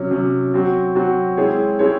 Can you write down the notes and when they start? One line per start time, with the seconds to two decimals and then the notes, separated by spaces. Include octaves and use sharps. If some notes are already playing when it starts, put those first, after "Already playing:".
Already playing: C3 F#3 C#4
0.11 C3 F#3 C#4
0.54 F#3 C4 F#4
0.95 F#3 C4 F#4
1.37 G#3 C4 E4 G#4 C#5
1.79 G#3 C4 E4 G#4 C#5